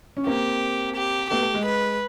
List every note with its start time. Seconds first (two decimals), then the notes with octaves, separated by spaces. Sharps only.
0.17 C#4
0.27 A#3 C4 G4
0.96 G4
1.31 A3 B3 G4
1.42 A3
1.54 G#3
1.66 B4